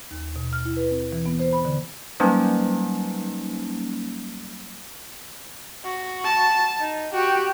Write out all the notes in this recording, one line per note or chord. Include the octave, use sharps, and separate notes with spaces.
D#2
B2
F6
E4
B4
C4
E3
B3
C5
B5
D3
F#3 G3 A#3 C#4 D#4
F#4
A5
D#4
F#4 G4